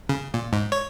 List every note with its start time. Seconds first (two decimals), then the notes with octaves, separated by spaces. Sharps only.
0.09 C#3
0.34 A#2
0.53 G#2
0.72 C#5